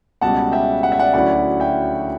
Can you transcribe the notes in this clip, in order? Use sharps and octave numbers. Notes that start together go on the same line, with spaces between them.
C#2 B2 G3 C#4 F#5 A5
E5 G5
F#5
E5
D5 F#5
D2 D3 F#3 C#4 E4 D5 F#5
E5 G5